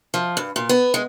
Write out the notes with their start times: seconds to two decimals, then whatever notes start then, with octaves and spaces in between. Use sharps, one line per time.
0.14 F3
0.37 G2
0.56 A#2
0.69 B3
0.94 G#3